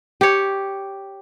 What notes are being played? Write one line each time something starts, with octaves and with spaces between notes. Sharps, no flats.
G4 C#5